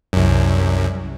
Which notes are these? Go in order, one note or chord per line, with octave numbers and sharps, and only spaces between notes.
C2 F#2